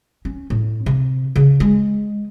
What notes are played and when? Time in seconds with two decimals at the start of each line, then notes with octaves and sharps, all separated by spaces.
0.25 C#4
0.50 A2
0.86 C3
1.36 C#3
1.60 G#3